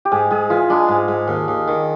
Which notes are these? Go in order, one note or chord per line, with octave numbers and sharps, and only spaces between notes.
G4
G#2 G#4
G#2 G#4
E3 F4
G#3 D4
G#2
G#2
D#2
D#2
D#3